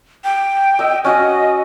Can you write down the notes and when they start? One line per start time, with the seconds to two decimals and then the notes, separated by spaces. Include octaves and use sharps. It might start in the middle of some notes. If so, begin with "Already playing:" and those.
0.24 G5
0.79 D#5 E5
1.04 C#4 F#4 D#5